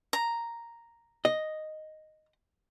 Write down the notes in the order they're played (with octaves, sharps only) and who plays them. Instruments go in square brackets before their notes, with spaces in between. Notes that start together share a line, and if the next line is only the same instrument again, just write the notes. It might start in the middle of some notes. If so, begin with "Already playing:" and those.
[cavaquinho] A#5
[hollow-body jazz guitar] D#5